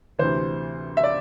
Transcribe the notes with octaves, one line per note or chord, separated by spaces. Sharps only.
D2 C3 E3 C5
E5
D5